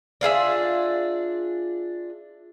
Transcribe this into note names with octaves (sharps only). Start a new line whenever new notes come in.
D4 F4 G#4 E5